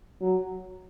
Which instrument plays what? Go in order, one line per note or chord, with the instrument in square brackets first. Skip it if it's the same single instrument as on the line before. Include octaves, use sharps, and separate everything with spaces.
[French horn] F#3